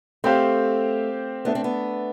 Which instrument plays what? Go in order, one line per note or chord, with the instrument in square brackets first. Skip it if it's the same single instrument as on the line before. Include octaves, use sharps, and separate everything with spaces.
[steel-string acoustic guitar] A3 [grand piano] C4 G4 C5 F5
[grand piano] A3 D4 A4 E5 [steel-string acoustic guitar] B3
[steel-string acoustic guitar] C4
B3